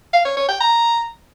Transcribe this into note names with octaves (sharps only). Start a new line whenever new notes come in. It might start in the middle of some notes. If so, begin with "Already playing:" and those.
F5
C#5
C#5
G5
A#5